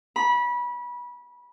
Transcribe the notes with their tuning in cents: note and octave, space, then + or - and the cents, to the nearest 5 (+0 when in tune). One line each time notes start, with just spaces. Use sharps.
B5 -25